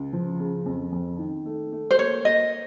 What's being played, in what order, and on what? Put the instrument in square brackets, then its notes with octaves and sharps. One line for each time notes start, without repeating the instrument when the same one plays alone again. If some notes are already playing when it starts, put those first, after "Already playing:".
Already playing: [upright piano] C#2
F3
C#3
F2
F2
D#3
A3
A3
[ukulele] C5
[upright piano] A#3 [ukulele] C#5
[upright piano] A#3 [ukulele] D#5